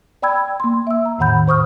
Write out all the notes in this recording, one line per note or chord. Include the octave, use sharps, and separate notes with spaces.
D5 G5 B5 E6 G#6
A#3 C6
E5 E6
A#5
E2 A2 D#3 F#5 B5 G6
G#2 C5 C#6 D#6 F6